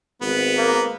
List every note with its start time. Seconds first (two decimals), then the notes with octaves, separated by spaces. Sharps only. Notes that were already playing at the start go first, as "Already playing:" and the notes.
0.21 G#1 B3
0.57 A#3